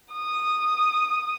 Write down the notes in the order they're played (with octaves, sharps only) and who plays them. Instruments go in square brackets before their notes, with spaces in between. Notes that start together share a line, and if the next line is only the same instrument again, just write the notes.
[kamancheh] D#6